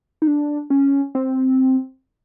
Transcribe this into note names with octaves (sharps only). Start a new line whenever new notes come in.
D#4
D4
C#4
C4